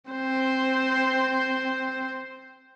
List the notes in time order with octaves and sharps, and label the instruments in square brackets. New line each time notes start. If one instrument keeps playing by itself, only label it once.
[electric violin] C4 C5